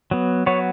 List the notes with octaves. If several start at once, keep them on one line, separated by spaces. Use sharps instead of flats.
F#3 B3
F#3 B3 C#5